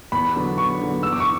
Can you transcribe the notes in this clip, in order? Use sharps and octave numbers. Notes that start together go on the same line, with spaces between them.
E2 B5
D3 F#3 B3
E2 C#6
D3 F#3 B3
E2 E6
D6
C#6